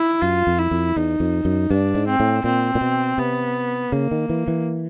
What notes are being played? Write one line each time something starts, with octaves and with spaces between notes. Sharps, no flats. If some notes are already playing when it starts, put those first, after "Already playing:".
Already playing: E4
F#2 F4
F2
E4
F2
E2 D#4
F2
F#2
G2 D4
G#2
C4
A2
A#2 C4
A#2
B2
C3 B3
C#3 A#3
D#3
E3
E3